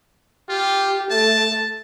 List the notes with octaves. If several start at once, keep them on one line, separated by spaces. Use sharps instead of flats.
F4 G4
A3 A5